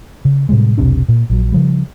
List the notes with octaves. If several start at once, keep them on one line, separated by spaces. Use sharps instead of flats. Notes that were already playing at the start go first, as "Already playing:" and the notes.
C#3
A2 C3 G3 G#3
E1 B1 C3 D4
A#2
A#1 F#3
C#3 F3 G3